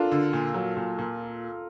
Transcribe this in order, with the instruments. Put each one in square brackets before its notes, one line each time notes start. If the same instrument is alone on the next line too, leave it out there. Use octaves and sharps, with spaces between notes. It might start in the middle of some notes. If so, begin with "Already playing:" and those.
Already playing: [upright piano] D4 [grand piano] F4 A4 A#4
[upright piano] D3
A#2
F#3
A#2
A#2